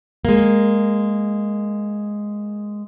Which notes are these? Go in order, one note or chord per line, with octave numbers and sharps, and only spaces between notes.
G#3 A#3